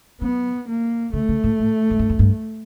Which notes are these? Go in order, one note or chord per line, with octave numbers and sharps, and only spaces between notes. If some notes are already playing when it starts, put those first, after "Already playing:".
F#3 B3
A#3
C#3 A3
C#3
A2
A2
G#2
G2
F#2
G2